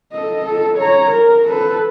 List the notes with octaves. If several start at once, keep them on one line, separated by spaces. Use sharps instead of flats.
A4 D#5
A4
C#5 A#5
A#4
A4 B4